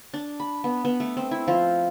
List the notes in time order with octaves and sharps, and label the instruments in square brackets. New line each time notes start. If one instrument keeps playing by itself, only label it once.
[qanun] D4
B5
B3
B3
A3
C4
E4
F3